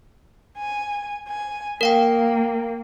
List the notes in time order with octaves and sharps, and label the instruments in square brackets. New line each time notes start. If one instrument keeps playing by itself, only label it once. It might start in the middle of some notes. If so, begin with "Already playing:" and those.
[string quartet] G#5
G#5
[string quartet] A#3 [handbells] A#4 F5 G5